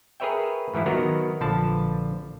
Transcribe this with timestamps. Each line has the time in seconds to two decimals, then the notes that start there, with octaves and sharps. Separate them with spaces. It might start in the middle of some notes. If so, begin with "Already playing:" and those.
0.20 G#4 A#4 B4 C#5 E5 G5
0.74 G#2 E3 F3 E4
0.86 D#3 F#3 B3 F#4 A#4
1.41 A#1 D3 F3 B4 A5